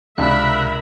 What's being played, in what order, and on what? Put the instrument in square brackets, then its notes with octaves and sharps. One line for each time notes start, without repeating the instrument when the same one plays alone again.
[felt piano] C#2 D4 [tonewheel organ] C3 F#6 [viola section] A#4 E5 B5